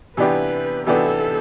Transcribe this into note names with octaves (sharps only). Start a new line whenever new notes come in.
C3 E3 B3 D4 G4 B4
C3 E3 B3 D4 G4 A4